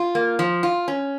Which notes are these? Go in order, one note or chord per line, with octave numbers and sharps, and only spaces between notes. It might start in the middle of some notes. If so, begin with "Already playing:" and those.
Already playing: F4
A#3
F3
F4
C#4